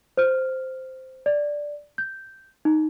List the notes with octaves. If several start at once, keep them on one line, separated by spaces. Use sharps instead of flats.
C5 F6
D5
G6
D#4